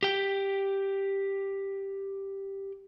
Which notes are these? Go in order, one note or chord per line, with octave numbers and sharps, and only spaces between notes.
G4 G5